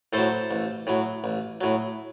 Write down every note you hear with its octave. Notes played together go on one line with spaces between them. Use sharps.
A2 F#3 A4 C5
A1
A2 F#3
A1
A2 F#3